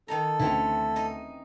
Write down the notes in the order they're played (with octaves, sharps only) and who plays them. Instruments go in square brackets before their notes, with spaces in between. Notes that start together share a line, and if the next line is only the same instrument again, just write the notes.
[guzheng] D#3 D#4 A#5 [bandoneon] A4
[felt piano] D2 A3 [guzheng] E3 C4 C#4
[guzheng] D#4 D#5